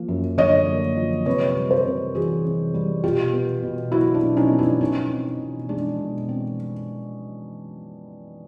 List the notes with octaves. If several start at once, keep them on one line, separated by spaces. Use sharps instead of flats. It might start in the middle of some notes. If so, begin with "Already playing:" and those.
Already playing: F3 A#3
F#2
D3 C#5 D#5
A#3
F3
C3 B4 C#5
G3
A#4 C5
C3
E3 F#4 G#4
C3
G3
B2 F4 G4
B3
B2
F#3 E4 F#4
D4
B2
C#4 D#4
B3
D4 E4
B2 C#4 D#4
C4
B2
G#3 D4
B2
C4